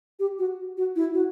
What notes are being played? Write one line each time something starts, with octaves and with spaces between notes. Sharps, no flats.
G4
F#4
F#4
E4
F#4